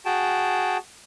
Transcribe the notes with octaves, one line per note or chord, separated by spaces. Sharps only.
F#4 G#4 G5 A5